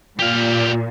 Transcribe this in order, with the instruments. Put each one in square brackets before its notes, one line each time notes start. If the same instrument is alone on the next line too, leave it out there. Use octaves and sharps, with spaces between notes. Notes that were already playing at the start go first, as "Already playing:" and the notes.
[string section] A#2 [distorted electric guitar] G4 F5